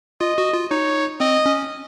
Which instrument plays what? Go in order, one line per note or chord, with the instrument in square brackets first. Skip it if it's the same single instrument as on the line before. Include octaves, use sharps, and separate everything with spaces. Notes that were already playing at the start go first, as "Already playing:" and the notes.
[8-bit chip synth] F4 [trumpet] D#5
[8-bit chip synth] F#4
F4
[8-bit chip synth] D#4 [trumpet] C#5
[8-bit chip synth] C4 [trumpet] D#5
[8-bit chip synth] C#4